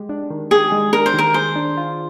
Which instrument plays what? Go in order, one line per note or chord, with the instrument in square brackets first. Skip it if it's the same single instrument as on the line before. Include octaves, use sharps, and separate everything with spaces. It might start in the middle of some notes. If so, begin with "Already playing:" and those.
Already playing: [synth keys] G#3 G4
D4
D#3
[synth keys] G4 [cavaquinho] G#4
[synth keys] G#3
[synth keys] D4 [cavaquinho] A#4
[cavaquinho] C5
[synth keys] D#3 [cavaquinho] A#4
[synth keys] G#4 [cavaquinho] C5
[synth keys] D4
F4